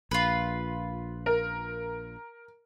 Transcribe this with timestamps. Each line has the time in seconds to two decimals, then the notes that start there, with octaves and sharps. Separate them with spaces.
0.11 A#1 F4 B4
1.26 A#4